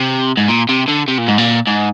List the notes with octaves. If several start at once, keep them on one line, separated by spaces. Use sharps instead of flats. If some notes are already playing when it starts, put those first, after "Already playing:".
Already playing: C3
G#2
A#2
C3
D3
C3
A#2
G#2
A#2
G#2